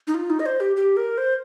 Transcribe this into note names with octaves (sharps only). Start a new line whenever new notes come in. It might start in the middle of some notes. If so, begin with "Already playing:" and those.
D#4
F4
D#4
D#5
C5
G4
G4
A#4
C5